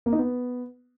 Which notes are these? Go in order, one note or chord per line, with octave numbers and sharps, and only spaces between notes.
A#3
D#4
B3